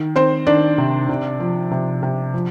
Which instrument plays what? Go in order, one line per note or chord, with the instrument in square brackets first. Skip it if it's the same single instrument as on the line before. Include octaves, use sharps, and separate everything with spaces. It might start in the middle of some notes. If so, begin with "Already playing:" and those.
Already playing: [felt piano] D#3
D#3 C4 C5
D#3 D4 D5
C3
C3
F3
C3
C3
F3